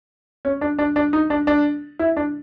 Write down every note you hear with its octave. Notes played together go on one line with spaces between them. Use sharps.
C#4
D4
D4
D4
D#4
D4
D4
E4
D4